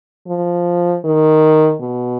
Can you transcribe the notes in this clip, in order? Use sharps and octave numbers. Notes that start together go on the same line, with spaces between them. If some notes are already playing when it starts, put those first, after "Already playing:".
F3
D#3
B2